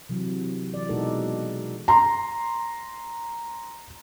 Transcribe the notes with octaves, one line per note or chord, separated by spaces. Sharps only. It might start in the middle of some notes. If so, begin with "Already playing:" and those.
C3 E3 F#3
E3 D5
B2 G#3 D#4 F#4 A4 A#4
A#5 C6